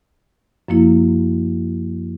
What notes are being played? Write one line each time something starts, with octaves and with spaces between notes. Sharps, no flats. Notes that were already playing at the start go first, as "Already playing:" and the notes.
F#2 F3 A#3 E4